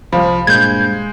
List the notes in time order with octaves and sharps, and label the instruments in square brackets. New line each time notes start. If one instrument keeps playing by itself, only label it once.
[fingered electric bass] C2 G3 [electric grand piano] F3 [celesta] C5 F5 B5
[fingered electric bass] G2 A#2 [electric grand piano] G#3 [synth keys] G6 G#6